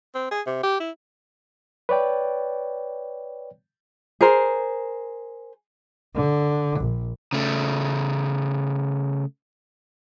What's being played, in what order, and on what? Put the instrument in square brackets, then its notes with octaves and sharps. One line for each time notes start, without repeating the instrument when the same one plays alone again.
[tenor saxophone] C4
G#4
C3
G4
E4
[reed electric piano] B4 C#5 D5 G5
[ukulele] G#4 A#4 C5
[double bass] D3
A#1
[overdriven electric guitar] C#3 A3